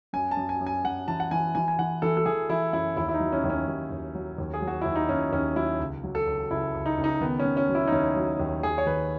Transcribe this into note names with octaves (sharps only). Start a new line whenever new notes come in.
F#2 G#5
A5
F#2
G#5
F#2
G#5
F#2 F#5
E3 A5
F#5
E3 G#5
E3 G#5
G#5
E3 F#5
E3 A4
A4
E3 G#4
E3 E4
F#2 E4
D#2 E4
E4
D#4
F#3
C#4
D#2
C#4
D#2
D#2
F#3
D#2
G#4
F#3
F#4
D#2 E4
D#4
D#2 C#4
D#2 C#4
F#3 E4
C#2
F#3
A4
C#2
C#2 E4
C#2
D#4
C#2
D#4
D#3 B3
C#4
D#3
C#4
F#3
E4
D#4
D#2 C#4
F#3
D#2
D#3 G#4
C#5
D#3 B4